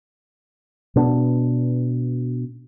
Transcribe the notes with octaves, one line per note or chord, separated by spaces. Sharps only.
B2 B3 D4